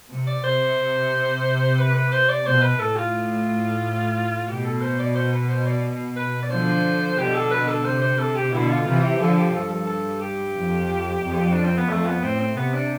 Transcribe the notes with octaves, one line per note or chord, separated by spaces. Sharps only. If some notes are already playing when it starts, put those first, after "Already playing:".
C3
D5
C3 C5
B4
B4
C5
D5
B2 C5
B4
A2 A4
F4
B2 G4
A4
C5
D5
C5
B4
C5
D5
B4
D5
D3 F3 C5
B2 D3 G4
A4
B4
A4
C3 C5
C5
A4
G4
B2 D3 E4
F4
C3 E3 F4
G4
D3 F3 A4
G4
G2 A4
A4
A4
G4
F2
F2
D4
C4
B3
F2 A3
B3
A2 C4
C4
C3 B3
D4